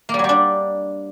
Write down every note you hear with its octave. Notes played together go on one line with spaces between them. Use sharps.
A#3
G3
F#3
G3
D4